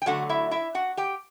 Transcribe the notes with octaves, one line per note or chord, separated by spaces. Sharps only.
G5
D3 F#3 A3 F#4 F#5
E4 E5
E4 E5
F#4 F#5
G4 G5